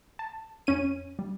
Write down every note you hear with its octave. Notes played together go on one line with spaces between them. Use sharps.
A5
F2 C#4 D#7
G3